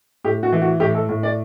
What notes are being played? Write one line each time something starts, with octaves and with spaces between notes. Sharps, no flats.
A2 G4
F#4
E3
F#4
A2 G4
A4
A2
D5